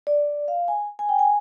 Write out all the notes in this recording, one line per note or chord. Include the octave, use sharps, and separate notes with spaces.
D5
F5
G#5
G#5
G5
G#5